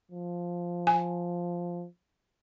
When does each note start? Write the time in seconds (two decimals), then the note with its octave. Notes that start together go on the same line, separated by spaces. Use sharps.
0.11 F3
0.87 G#5